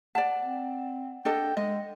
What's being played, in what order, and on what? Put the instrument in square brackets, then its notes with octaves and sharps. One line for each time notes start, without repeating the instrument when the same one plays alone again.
[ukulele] D5 A5 [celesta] F#5
[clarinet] C4
[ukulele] D4 A4 D#5 [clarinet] G5
[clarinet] G#3 [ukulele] D#5